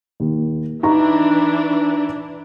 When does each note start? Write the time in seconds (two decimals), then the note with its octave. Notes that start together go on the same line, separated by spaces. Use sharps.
0.20 D#2
0.83 E3 D4 D#4 A#5 C#6